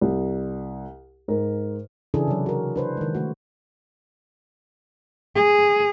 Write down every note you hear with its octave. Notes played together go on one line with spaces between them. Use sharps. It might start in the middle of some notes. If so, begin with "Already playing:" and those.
C2
G#2 A#4
C#3 E3 D4 E4 G#4 A4
C3 F#3
F#4 A#4
D4 B4 C5
D#3 G#3
A3 F#4
G#4